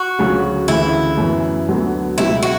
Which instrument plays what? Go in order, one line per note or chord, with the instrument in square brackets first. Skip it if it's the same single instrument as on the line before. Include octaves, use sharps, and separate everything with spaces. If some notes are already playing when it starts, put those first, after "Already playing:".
Already playing: [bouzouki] F#4
[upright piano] D2 C#3 F#3 C#4
[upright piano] D2 C#3 E3 [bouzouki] E4
[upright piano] F#2 E3 B3
D2 D3 F#3 B3
[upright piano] C#2 B2 F#3 [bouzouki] E4
[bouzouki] F#4